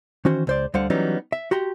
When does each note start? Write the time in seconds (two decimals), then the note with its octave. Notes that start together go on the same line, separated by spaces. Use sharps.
0.25 D#3 E3 C#4 F#4 C5
0.47 C#2 C5 D5
0.74 D2 D3 G3 C5 F5 F#5
0.90 E3 F#3 G3 B3 C#4 D#4
1.32 E5
1.51 F#4 G4 A#5 C6